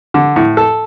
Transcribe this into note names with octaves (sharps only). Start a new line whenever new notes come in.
D3
A2
A4